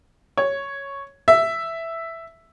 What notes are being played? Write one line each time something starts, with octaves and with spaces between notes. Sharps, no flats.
C#5
E5